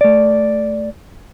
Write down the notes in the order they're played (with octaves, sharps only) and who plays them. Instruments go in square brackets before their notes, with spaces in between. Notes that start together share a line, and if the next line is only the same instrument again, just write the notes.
[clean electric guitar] A3 D5